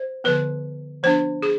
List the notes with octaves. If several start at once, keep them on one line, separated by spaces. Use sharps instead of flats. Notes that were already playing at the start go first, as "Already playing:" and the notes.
Already playing: C5
D3 F3 B3 B4
F3 B3 D4 C5
G#4